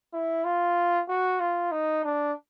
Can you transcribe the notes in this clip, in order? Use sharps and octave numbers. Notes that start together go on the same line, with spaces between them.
E4
F4
F#4
F4
D#4
D4